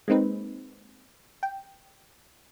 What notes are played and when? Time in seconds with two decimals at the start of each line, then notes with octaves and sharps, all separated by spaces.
0.08 G#3 A#3 C4 D#4 B4
1.43 G5